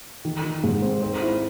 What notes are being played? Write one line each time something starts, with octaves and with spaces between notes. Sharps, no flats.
D#3
D#3
G#2
C4
C4
E4